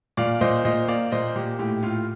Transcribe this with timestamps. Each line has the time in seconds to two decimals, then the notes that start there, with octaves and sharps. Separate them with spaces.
0.17 A#2 D5 F5
0.41 A#2 C5 D#5
0.64 A#2 C5 D#5
0.88 A#3 D5 F5
1.12 A#2 C5 D#5
1.36 A#2 G4
1.59 A2 G4
1.83 A2 F4